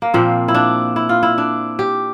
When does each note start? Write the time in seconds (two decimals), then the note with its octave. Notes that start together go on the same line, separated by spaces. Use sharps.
0.02 A#3
0.14 A#2 F3 C4
0.48 E4
0.54 D4
0.96 E4
1.09 F4
1.23 E4
1.38 D4
1.79 G4